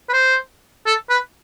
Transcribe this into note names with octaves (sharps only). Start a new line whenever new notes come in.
B4
C5
A4
B4